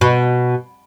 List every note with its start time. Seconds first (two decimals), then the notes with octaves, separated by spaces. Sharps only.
0.01 B2